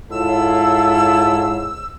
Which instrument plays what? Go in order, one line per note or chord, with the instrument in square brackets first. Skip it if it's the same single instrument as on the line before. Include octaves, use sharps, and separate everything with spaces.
[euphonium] G#2 [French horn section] E4 F4 C#5 [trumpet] A4 [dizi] E6